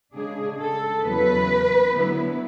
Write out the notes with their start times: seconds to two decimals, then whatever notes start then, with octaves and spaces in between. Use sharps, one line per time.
0.16 C#3 G#3 D4 G#4
0.60 A4
1.05 E2 C#3 F#3 B4
1.94 D3 F#3 B3 E4